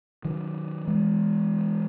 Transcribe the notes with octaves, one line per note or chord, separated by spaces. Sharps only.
D#3 F#3
E3 G#3